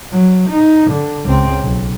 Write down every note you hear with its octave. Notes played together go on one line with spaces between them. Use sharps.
F#3
D#4
D3
C#2 C4
B1